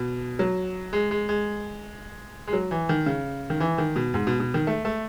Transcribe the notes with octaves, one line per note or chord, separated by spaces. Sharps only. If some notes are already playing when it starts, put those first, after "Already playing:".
Already playing: B2
F#3
G#3
G#3
G#3
G#3
F#3
E3
D#3
C#3
D#3
E3
D#3
B2
G#2
B2
B2
D#3
A3
A3